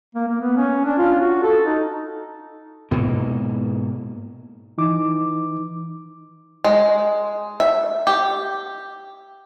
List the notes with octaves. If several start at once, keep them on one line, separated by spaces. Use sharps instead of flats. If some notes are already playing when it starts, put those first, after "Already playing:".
A#3
A#3
B3
C#4
D4
F4
F#4
A4
D#4
G#2 B2 A#3
E3 D#4 D6
G#3
E5
G4